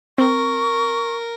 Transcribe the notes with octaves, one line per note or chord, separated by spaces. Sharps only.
C4 A#4 C#6